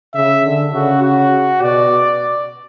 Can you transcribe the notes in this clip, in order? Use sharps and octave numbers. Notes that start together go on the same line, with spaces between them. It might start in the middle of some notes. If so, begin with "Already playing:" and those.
C#3 E5
D3
C#3 F#4
F#4
B2 D5